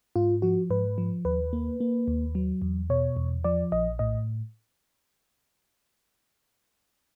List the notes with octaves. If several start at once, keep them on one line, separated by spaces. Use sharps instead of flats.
G#2 F4
F3 F#4
G#2 B4
F3
D#2 B4
A#3
A#3
D#2
F#3
E2
B2 C#5
E2
F3 D5
A#1 D#5
A2 D#5